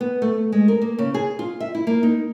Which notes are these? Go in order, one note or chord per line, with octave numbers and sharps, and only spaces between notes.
B3
A3
G#3
A#4
A#3
C#3
G#4
F4
E5
E4
A#3
D#4